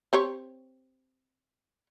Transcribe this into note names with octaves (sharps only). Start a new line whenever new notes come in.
C4 G4 C#5